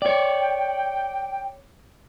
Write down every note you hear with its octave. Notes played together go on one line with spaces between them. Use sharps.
C#5 D5 G5